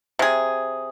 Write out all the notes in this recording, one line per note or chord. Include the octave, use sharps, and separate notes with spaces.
C3 G#4